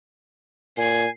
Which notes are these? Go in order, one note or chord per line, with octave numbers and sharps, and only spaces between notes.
A#2 G#5 C7